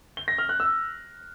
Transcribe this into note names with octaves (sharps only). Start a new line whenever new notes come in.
G7
A#6
F6
F#6
E6